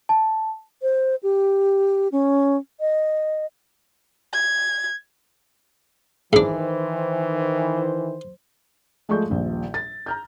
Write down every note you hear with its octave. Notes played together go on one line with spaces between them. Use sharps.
A5
C5
G4
C#4
D#5
G#6
G#2 D#3 E3 D4 C5
F3 G#3 A3 D5 C#6 G6
D#1 A#1 A#2
A6
A#5 F6 G6